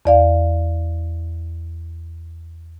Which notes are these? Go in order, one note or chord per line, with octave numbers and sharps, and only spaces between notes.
E2 D5 F5